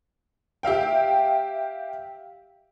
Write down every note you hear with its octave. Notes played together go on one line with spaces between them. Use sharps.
G4 E5 F5 G5